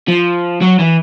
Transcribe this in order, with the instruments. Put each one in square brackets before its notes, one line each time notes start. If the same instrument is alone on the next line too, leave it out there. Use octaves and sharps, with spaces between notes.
[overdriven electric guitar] F3
F#3
E3